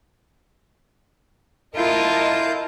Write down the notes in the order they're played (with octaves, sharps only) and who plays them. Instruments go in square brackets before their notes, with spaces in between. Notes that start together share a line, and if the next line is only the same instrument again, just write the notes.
[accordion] E4 F5 G6 [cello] F4 [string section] A#4 D#5 A5